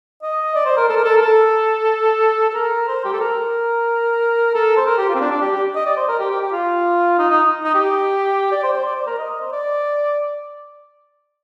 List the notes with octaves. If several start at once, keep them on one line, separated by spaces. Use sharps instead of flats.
D#5
D5
C5
A#4
A4
A#4
A4
A#4
A4
A4
A#4
C5
G4
A4
A#4
A4
C5
A#4
G4
F4
C4
D4
D4
G4
G4
D#5
D5
C5
A#4
G4
G4
G4
F4
D#4
D#4
D#4
G4
D5
C5
C5
D5
C5
A#4
D#5
C5
D5